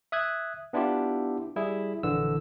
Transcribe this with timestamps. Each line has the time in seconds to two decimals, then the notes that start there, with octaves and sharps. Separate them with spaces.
0.12 E5 D#6 F#6 G#6
0.73 B3 D4 E4 F4 G4
1.56 G3 E4 G#4
2.03 A#1 D3 E3 E6